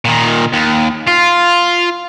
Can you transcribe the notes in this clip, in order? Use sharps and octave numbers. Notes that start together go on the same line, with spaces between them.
A#2 D#3
D#2
F4